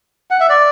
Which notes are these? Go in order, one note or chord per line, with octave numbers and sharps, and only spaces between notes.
F#5
E5
D5